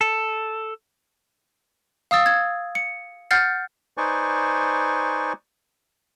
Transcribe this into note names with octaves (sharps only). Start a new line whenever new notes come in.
A4
F5 D#6 E6 A6
G#6
C#7
F#5 F6 G6 A6 C7
D#4 B4 C5 D5 G#5 C#6